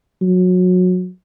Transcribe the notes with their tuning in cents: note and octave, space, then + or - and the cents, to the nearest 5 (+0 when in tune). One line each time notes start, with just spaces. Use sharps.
F#3 -25